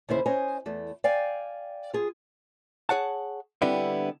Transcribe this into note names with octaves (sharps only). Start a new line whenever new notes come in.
D#2 C#3 E4 C5
C#4 C5 D#5 G#5
E2 A3
D5 F5 G5 G#5
F4 G#4
G#4 C#5 F#5 A5
D3 G3 B3 C4 D4 E4